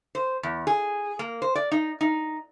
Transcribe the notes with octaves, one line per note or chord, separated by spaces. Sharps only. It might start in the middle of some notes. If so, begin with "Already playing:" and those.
C5
E2
G#4
A#3
C5
D5
D#4
D#4